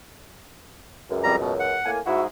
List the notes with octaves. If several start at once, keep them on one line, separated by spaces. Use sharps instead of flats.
C#2 F#2
F2 G3 A#5
B2
F#5
A2 A#3 G#5
G#2 E4 F#4